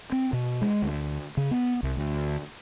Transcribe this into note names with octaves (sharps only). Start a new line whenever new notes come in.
C4
B2
G#3
D2
C#3
B3
C2
D2